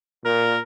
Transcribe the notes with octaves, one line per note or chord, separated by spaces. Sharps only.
A#2 A#4